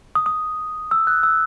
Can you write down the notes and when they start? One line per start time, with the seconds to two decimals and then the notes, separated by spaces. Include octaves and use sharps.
0.15 D#6
0.26 D#6
0.91 E6
1.07 F#6
1.23 E6